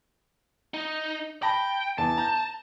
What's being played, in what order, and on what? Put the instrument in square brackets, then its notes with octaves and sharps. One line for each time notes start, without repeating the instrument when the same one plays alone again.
[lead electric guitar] D#4
[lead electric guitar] G5 [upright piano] A5 B5 A#6
[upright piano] E2 [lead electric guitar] A5
[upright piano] A#5 G6